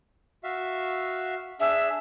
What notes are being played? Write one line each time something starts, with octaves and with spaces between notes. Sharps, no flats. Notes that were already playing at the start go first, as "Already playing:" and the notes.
F#4 E5 F5
D4 G#4 E5